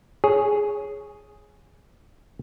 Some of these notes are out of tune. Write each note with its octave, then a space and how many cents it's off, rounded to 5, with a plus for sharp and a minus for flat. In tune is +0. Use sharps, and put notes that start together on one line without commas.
G#4 +0 C#5 +0